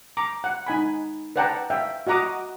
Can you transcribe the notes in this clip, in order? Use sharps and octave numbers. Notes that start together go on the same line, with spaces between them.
A#5 D6
F#5
D#4 G#5 B5
B4 D5 F#5 G5 A5 A#5
E5 F5 G5
F#4 D#5 F#5 A#5 D6 D#6